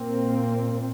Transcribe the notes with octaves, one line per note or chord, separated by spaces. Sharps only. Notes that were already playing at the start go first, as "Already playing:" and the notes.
Already playing: A#2 A#3 C4